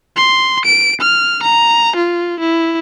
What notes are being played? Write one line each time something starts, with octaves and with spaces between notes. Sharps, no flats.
C6
D7
F6
A#5
F4
E4